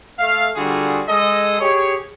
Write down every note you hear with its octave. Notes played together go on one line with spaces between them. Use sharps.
A3 F5
D3 G3 F4 F#4 G#4
G#3 G#4 A4 D#5
G4 G#4 C#5